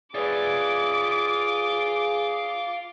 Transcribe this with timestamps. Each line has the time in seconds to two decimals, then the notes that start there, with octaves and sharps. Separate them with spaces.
0.15 F4 G#4 B4 C#5 D5 E5 D6